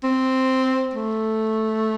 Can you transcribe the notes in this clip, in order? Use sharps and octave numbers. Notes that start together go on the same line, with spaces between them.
C4
A3